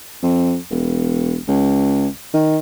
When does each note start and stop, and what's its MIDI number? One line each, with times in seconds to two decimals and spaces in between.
0.23 0.56 41
0.70 1.38 28
1.48 2.07 37
2.34 2.58 51